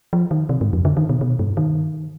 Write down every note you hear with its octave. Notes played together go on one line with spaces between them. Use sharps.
F3
D#3
C3
G#2
F2
D3
D#3
B2
B2
G2
D#3